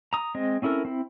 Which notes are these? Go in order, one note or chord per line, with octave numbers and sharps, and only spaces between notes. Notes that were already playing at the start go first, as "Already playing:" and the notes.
A#5 D#6
G#3 C4 D#5
C4 C#4 E4 A4 A#4
C4 E4